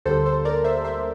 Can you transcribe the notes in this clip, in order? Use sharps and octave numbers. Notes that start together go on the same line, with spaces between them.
D2 D3 G3 A#3 A4 C5
A4 C5
A#4 D5
C5 E5
C5 E5